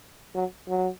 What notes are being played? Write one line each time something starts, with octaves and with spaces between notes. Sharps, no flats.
F#3
F#3